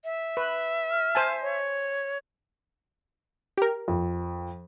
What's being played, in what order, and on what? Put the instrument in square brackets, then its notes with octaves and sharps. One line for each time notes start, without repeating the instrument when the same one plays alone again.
[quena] E5
[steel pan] B4
[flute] F6
[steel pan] C5 G#5 A5
[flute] C#5
[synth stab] G4 A#4
[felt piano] F2